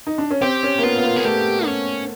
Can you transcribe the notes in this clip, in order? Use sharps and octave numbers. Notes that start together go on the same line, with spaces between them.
D#4
D4
C#4
C4 G4
C#4
A#3
B3 F4
B3
A#3
A#3 G#4
A3 G4
C#4